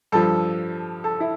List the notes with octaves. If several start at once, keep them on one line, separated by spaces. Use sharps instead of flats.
G2 F3 A4
A4
E4